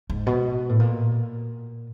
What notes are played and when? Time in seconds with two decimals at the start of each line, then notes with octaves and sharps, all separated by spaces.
0.10 G#2
0.26 B2
0.69 A2
0.80 A#2